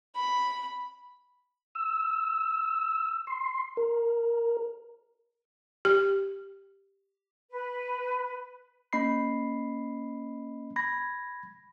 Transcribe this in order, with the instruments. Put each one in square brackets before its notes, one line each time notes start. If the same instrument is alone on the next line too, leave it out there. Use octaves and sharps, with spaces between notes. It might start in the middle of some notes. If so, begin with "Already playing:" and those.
[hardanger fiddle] B5
[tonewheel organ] E6
C6
A#4
[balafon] G4
[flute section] B4
[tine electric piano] A#3 C#4 D#5 B5 C7
B5 G#6 A#6